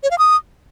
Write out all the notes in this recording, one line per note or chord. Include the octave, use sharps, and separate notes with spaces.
C#5
F5
D#6